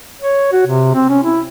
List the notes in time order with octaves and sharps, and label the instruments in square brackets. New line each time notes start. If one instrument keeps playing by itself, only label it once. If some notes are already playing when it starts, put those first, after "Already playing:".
[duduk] C#5
F#4
C3
C4
C#4
E4